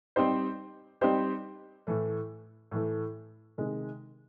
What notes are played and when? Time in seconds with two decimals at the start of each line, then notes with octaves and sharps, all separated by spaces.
0.16 G3 C4 D#4 G4 C5
1.01 G3 C4 D#4 G4 C5
1.87 A2 E3 A3
2.71 A2 E3 A3
3.58 C3 D#3 G#3